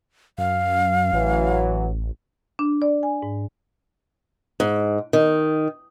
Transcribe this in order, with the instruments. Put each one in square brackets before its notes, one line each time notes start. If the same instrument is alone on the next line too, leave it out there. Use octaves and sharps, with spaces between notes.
[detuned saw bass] F#2 [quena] F5
[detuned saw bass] A1 [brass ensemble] E3 F#3
[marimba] D4
D5
G#5
G#2
[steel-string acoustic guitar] G#2
D#3